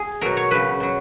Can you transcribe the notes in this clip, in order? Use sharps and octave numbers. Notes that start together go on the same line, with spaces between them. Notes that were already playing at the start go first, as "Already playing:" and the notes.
Already playing: G#4
B2 F#3 A#4
C#5
C#3 F#3 B4
B2 F#3